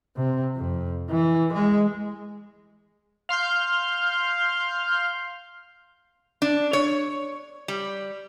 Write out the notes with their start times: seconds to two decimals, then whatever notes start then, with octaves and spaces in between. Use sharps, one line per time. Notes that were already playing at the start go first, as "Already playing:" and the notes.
0.16 C3
0.56 F2
1.10 E3
1.54 G#3
3.29 F5 C6 F6 G6
6.42 D4
6.73 C#5
7.68 G3